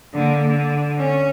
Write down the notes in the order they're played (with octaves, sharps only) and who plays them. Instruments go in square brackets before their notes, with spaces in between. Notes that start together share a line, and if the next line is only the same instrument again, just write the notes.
[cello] D3 A#3
D3
C#4